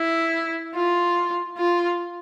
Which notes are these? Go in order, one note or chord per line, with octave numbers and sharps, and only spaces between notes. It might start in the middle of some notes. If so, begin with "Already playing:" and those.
Already playing: E4
F4
F4